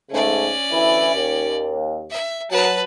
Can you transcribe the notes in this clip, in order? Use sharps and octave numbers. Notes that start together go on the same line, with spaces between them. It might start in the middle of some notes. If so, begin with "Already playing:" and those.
G#2 C#3 A3 C#4 D5
D2 E3 E4
D#2
E5
F#3 B4 A5